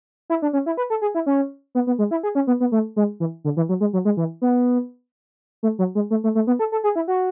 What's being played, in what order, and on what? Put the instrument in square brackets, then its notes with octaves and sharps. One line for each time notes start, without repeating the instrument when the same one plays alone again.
[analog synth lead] E4
D4
C#4
E4
B4
A4
G#4
E4
C#4
B3
B3
G#3
E4
G#4
C#4
B3
B3
A3
G#3
E3
D3
E3
F#3
G#3
F#3
G#3
E3
B3
A3
F#3
G#3
A3
A3
A3
B3
A4
A4
G#4
E4
F#4